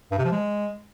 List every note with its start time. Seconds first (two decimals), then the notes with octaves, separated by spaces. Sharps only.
0.11 G2
0.18 C3
0.25 F3
0.32 G#3